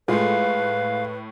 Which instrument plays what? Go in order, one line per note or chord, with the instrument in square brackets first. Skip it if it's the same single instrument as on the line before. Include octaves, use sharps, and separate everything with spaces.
[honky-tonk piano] A2 A3 [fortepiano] G#3 F4 [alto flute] B4 [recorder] F5